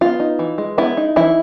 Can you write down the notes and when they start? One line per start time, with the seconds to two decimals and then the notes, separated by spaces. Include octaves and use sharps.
0.01 B3 F4
0.20 D#4
0.39 E3
0.58 G#3
0.78 B3 E4
0.97 D#4
1.16 E3 E4